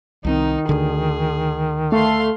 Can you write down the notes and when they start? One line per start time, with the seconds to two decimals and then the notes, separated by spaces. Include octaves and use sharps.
0.25 C2 D#3 E3 C4 D#4
0.69 D2 D3 G#4
1.92 A3 F5 C6